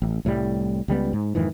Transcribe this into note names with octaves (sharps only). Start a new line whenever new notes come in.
A1
C2 A2 F3 G3
C#2 G3 G#3 B3
G#2
F2 G#2 D#3 E3